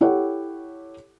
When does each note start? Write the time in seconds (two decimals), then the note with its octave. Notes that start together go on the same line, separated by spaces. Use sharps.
0.01 E4 G4 A4 C#5 F#5